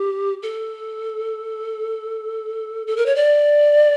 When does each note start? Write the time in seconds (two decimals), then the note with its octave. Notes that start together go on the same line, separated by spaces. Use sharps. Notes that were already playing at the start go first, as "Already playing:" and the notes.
Already playing: G4
0.43 A4
2.87 A4
2.97 A#4
3.06 C#5
3.16 D5